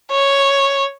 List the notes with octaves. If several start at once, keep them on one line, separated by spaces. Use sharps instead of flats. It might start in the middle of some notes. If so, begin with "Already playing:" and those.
C#5